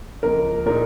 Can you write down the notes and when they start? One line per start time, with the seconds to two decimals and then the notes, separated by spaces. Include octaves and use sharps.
0.23 C#2 C#3 F3 A#3 A#4
0.66 A#2 G#3 D#4 A#4